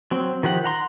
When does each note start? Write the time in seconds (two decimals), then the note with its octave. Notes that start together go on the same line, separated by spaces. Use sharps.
0.11 F#3 C4
0.43 D#3 F3 G4 F#5
0.64 F#5 A#5 C6